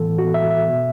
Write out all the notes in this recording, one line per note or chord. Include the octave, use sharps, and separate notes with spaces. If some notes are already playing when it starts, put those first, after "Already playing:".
Already playing: A2 E3 B3 A4
A2 E3 B3 F#4
E5
E5
B2 B3